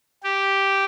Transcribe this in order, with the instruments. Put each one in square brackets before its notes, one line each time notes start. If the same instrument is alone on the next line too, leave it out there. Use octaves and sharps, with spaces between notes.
[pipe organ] G4